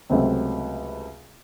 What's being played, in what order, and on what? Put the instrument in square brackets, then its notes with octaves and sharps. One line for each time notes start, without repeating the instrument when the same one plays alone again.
[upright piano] C#2 C3 F#3 A3 C4